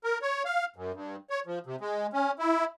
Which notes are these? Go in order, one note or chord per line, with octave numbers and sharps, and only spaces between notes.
A#4
C#5
F5
F#2
G2
C#5
F3
C3
G#3
C#4
E4